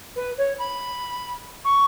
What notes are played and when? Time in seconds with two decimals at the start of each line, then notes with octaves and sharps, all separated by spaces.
0.15 B4
0.37 C#5
0.58 B5
1.64 C#6